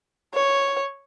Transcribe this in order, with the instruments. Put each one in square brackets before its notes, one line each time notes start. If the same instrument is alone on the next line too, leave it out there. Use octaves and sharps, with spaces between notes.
[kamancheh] C#5